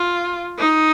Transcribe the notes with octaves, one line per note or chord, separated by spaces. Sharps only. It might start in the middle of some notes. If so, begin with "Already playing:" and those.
Already playing: F4
D#4